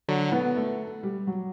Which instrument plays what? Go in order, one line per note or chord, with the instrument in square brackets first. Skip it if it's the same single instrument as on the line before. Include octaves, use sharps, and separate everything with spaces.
[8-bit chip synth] D3 F#3
[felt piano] B3
A3
G3
F#3